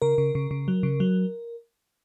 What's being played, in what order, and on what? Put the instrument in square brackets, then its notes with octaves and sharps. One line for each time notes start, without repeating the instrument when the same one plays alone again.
[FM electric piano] C#3 A#4
C#3
C#3
C#3
F#3
C#3
F#3